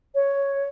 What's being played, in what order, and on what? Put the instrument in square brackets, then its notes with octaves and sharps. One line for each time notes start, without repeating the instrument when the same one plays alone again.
[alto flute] C#5